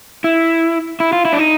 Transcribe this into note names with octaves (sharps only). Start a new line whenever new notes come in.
E4
E4
F4
E4
D4
D#4